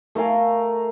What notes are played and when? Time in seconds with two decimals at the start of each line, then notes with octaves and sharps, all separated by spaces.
0.15 A3 A#4 F5 G#5